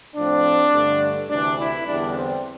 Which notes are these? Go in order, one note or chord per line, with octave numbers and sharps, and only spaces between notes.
A2 F3 C4 D4
G2 D3 A3
D2 C3 E3 D4
E4
E2 D3 G3 D4
C4